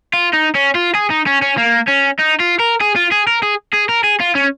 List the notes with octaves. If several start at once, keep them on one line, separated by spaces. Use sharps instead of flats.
F4
D#4
C#4
F4
G#4
D#4
C#4
C#4
A#3
C#4
D#4
F4
A#4
G#4
F4
G#4
A#4
G#4
G#4
A#4
G#4
F4
C#4